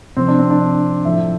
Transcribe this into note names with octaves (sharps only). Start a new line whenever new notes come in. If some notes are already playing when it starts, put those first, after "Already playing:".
C3 F3 C4
D4
C4
D4
A2 F3 E5